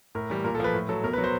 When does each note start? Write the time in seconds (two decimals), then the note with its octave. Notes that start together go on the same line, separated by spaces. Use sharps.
0.15 A2 A#4
0.30 E3 G3
0.44 A#2 A#4
0.55 A4
0.60 F3 B4
0.74 A2
0.89 F#3 A4
1.03 B2 A#4
1.13 B4
1.18 F#3
1.24 C5